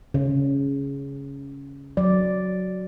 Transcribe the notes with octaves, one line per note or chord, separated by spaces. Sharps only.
C#3
F#3 D5